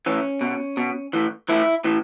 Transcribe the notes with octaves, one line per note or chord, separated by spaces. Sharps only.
A2 E3 C#4
B2
B2
A2 E3
A2 E3 E4
A2 E3